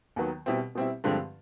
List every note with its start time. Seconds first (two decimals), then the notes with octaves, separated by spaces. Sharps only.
0.16 D#2 D#3 F#3 B3
0.46 B2 G3 C4 E4
0.75 B2 G3 C4 E4
1.04 G2 D3 F3 G#3 C4